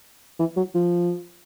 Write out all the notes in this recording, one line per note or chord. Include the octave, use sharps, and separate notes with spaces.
E3
F#3
F3